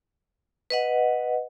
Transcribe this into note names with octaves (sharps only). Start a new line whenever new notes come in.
B4 D#5 F#5